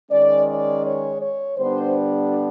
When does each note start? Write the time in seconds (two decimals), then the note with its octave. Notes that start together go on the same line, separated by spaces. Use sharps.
0.10 D#3 G#3 C#4 D5
0.48 D5
0.84 C#5
1.21 C#5
1.57 D3 G3 B3 D4 C5